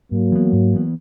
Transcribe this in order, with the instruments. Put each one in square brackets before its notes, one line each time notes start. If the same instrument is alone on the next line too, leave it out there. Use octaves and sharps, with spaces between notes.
[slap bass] G#2 [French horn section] F#3 A#3
[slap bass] E3 B3
G#2
E3 B3